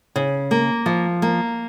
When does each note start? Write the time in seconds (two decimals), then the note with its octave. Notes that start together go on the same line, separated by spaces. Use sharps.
0.16 C#3
0.51 A#3
0.86 F3
1.22 A#3